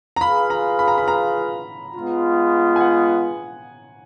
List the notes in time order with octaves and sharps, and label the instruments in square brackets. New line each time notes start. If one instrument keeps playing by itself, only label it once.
[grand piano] A#5
[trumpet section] F4 G#4 B4 F5 [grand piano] B5
[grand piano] A#5
B5
A#5
B5
A#5
[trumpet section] G#3 B3 F4
[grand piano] G#5
F#5